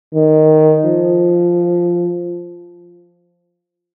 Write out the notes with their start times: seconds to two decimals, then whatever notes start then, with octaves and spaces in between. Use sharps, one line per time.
0.14 D#3
0.85 F3